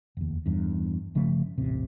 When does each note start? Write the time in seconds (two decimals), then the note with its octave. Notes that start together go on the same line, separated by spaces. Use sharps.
0.17 F1 D#2
0.46 E2 G2
1.15 G1 C#3 F3 A3
1.58 D#1 A1 C3